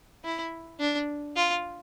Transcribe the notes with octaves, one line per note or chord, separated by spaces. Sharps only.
E4
D4
F4